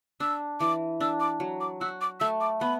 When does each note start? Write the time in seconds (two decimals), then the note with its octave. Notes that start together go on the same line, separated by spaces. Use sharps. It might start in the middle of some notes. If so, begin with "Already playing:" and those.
0.20 D4 E6
0.60 E3 D6
1.00 D4 E6
1.20 D6
1.40 F#3
1.61 D6
1.81 F#4 E6
2.01 D6
2.20 A3 E6
2.41 D6
2.61 B3 B5